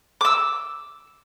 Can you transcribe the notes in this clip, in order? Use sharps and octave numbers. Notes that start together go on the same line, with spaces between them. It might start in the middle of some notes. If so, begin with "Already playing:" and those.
D6 E6